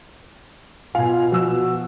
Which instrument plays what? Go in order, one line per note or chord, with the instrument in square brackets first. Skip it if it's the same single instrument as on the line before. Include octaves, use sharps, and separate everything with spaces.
[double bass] B2 [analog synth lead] F4 [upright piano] F5 G#5
[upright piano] F3 E6 [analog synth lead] F#4